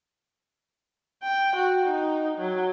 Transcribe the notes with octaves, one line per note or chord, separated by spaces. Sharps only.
G5
F#4
D#4
F#3